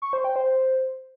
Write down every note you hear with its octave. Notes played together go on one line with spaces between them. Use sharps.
C#6
C5
G5
C5